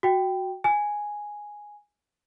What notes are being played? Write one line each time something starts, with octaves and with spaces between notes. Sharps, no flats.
F#4 G5
G#5